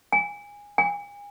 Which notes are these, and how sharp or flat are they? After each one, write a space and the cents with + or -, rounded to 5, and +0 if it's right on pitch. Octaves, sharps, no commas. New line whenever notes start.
G#5 -20
G#5 -35